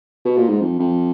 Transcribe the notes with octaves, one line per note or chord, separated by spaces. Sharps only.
B2
A#2
G#2
F2
F2